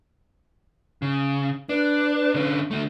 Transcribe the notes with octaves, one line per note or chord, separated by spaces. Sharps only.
C#3
D4 B4
D3 C#4
D3 A3